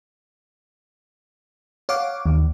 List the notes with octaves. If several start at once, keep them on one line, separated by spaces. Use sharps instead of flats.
C#5 F5 F#5 D6
D#2